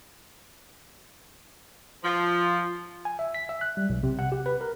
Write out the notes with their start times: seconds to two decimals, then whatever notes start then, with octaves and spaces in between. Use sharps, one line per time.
2.03 F3
3.05 G#5
3.19 E5
3.34 B6
3.49 E5
3.61 F#6
3.77 G3
3.90 B1
4.03 C3
4.19 F#5
4.32 G4
4.46 B4
4.61 A#4